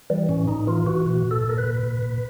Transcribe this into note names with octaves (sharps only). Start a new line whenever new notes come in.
E3 G3
A2 C#4
A2 D#4
E3 F4
E3 F#4
A#2 F#4
A#2
A4
A#2
A#4
B4
A#2
A#2
A#2